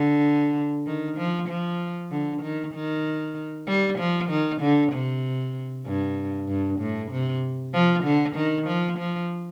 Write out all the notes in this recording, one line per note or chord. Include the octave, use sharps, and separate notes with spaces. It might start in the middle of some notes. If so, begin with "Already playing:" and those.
Already playing: D3
D#3
F3
F3
D3
D#3
D#3
G3
F3
D#3
D3
C3
G2
G2
A2
C3
F3
D3
D#3
F3
F3